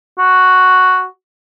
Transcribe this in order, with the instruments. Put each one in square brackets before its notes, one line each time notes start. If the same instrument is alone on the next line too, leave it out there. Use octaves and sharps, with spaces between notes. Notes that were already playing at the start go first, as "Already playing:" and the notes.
[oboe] F#4